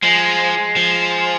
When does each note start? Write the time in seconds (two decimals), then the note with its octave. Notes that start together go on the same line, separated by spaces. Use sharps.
0.03 F3 G#3
0.76 F3